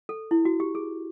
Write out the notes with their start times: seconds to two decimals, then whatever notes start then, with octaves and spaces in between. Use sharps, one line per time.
0.09 A4
0.31 E4
0.45 F#4
0.60 G4
0.75 G#4